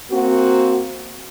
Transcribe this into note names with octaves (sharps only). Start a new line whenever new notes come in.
A#3 C4 F#4